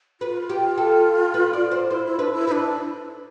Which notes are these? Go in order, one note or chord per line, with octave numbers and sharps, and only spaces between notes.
F4 B4
G4
A4
B4
D5
C5
E4 C5
E4
D4 B4
E4
D4 E4 B4